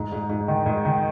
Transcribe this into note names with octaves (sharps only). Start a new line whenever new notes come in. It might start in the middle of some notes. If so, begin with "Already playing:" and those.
Already playing: G#2
G#2
G#2
D#3
G#2
D#3